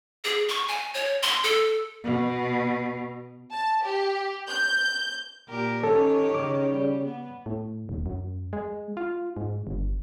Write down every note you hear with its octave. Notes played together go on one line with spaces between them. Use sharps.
G#4
C#6
G#5
C#5
C6
A4
B2
A5
G4
G6
A#2 G4 A#4
D#3 C#4 G4 A4 C#5
C#3 D6
G3
B3
A2
D#1
F#2
G#3
F4
G#2
G1